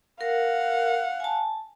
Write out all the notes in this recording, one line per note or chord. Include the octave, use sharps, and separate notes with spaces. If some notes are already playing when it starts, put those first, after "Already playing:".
A#4 F5 F#5
G#5 A5